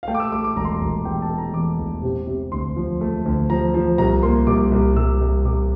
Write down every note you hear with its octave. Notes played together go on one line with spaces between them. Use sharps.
F5
A3 G5
D6
E6
A3 D6
D6
E1 A#5
C6
A#5
E1
E2 G5
A5
A3
A#5
E2 D6
E2
C3
C3
D2 C6
F3
A3
D2
F3 A#5
F3
C2 A#5
A#3 C6
C2 D6
C2
C2 E6
C2
C2 D6